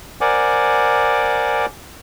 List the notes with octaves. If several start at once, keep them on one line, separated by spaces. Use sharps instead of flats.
A#4 C5 D5 F#5 G#5 D6